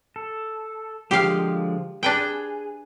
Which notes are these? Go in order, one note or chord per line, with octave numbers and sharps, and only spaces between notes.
A4
D3 F3 G#3 G4 F5
D4 G#4 B4 G5